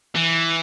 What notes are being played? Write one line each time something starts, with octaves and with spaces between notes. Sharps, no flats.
E3